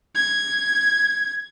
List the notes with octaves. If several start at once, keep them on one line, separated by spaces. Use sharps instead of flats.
G#6